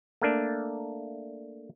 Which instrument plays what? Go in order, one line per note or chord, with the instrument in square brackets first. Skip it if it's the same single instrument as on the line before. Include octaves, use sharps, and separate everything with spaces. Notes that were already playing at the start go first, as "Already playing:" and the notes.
[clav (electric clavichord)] A3 A#3 D4